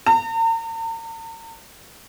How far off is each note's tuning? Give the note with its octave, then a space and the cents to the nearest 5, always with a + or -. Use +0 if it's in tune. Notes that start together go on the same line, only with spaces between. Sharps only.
A#5 -45